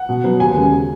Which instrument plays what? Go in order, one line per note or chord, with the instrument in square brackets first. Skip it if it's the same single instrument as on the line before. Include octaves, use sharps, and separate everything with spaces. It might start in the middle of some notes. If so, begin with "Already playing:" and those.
Already playing: [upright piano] F#5
B2
F#3 B3
D#2 G#5
C#3 G#3